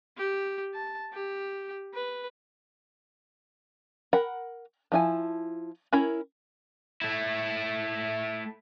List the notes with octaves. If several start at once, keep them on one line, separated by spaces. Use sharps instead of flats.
G4
A5
G4
B4
A#4 F#5 B5
F3 E4 G#5
C#4 E4 A#4 B5
A3 E4